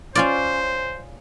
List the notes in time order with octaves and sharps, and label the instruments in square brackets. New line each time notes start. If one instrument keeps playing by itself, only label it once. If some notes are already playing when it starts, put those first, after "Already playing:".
[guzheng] C#4 F4 D5 [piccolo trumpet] C5